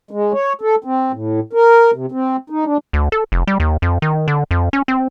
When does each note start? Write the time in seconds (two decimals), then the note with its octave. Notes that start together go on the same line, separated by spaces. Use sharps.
0.11 G#3
0.33 C#5
0.61 A4
0.84 C4
1.12 A2
1.53 A#4
1.93 C3
2.12 C4
2.50 D#4
2.65 D4
2.93 D2
3.12 A4
3.32 F1
3.47 G3
3.60 D#2
3.82 F2
4.02 D#3
4.28 D3
4.51 F2
4.73 C#4
4.88 C4